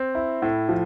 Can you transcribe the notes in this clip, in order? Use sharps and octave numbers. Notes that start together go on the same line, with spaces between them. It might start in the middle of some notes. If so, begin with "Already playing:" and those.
Already playing: C4
E4
A2
F3